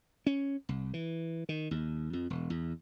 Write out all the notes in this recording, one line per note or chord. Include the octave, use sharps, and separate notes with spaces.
C#4
C2
E3
D#3
D#2
F2
E1
E2